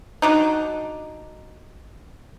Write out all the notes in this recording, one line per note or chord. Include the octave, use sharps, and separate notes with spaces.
F#3 D4 D#4